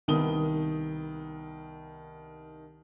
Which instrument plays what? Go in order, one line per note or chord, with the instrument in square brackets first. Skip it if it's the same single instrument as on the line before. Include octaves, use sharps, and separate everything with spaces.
[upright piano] C2 D#3 B3 D#6 G7